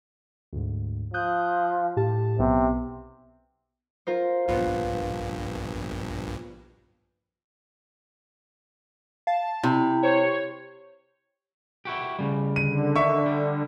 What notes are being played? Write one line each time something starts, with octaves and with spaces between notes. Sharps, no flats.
D2 G#2
F3 D#6 F#6 G6
A2 G4 A5
B1 C3 B3
F4 A#4 C5
A#1 G2 B3 F4
F5 A5
C3 E4
C5 C#5
E4 F#4 G4
C#3 G3
D3 D#7
D#3 E5 C#6
G3